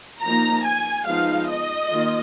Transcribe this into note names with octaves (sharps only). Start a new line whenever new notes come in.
F3 A#3 D#4 A#5
G#5
F3 G#3 B3 D#4 F5
D#5
D#3 A#3 F4